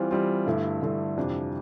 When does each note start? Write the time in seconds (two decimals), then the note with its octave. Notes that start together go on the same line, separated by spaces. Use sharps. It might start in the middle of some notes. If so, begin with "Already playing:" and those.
Already playing: E3 G3 C4 F4
0.11 E3 G3 C4 F4
0.46 G2 D3 A3 E4
0.82 G2 D3 A3 E4
1.17 F2 C3 E3 G3 D4